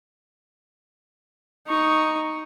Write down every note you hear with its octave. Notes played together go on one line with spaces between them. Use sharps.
D#4 C#6